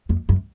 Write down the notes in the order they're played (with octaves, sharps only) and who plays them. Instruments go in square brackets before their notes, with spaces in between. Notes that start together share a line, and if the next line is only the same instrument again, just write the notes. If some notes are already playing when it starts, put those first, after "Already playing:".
[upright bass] F2
F#2